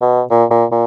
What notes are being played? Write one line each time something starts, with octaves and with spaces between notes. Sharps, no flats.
B2
A#2
A#2
A#2